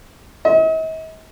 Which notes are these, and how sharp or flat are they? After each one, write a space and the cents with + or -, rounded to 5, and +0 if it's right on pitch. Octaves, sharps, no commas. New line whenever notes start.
D#5 +45